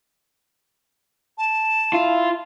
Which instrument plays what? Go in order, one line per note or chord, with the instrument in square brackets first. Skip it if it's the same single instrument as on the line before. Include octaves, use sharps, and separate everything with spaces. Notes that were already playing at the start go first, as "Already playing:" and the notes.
[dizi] A5
[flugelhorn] E4 [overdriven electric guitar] F4